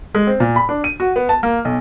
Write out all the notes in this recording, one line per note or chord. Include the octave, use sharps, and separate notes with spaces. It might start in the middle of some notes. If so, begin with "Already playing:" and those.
G#3
C4
A#2
B5
D4
D#7
F#4
B3
A5
A#3
B1